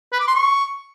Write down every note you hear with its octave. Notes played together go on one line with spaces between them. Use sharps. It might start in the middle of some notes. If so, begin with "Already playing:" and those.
B4
D6
C6
C#6